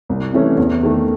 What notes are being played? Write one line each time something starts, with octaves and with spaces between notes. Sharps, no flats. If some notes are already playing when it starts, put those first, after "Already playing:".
C2
C3 E3 A3 C#4
E2
D#3 A3